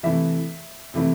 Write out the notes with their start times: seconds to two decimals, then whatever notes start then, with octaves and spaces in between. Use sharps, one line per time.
0.03 C3 E3 A3 E4 E5
0.94 C3 E3 A3 E4